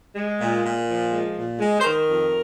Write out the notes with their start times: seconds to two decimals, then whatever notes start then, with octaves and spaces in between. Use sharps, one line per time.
0.16 G#3
0.41 A#2
0.64 A#2
0.88 F3
1.12 G#3
1.36 A#2
1.60 G#3
1.80 C5
1.83 D#3 A#4
2.08 F2